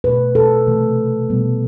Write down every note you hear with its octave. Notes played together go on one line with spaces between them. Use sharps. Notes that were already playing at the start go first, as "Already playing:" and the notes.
B2 A3 B4
A4
C3 E3 A3
B2 G3 B3